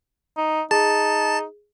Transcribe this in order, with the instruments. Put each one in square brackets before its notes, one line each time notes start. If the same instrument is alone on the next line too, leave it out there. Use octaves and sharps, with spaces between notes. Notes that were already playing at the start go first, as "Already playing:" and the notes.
[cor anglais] D#4
[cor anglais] D#4 [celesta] G#4 [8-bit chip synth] A5